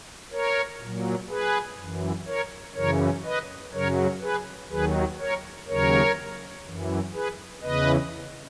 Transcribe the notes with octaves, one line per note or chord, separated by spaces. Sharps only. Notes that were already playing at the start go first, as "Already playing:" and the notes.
A#4 C#5
A#2 F#3
G#4 B4
F#2 E3
A#4 C#5
F#2 C#3 E3 A#4 C#5
B4 D#5
F#2 C#3 F#3 A#4 C#5
G#4 B4
D#2 D#3 F#3 G#4 B4
A#4 C#5
D#2 C#3 F#3 A#4 C#5
F#2 E3
G#4 B4
E2 C#3 E3 B4 D#5